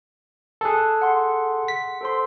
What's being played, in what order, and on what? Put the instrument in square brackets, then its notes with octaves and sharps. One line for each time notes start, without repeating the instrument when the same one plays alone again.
[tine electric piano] G#4 A4 [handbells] A5 F#6
[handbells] F#5 C6
[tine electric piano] B6
[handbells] A4 C5 C6